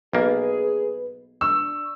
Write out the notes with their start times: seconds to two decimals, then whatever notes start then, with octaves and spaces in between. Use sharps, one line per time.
0.13 B1 A#3 G#4 B4
1.41 D4 C#6 E6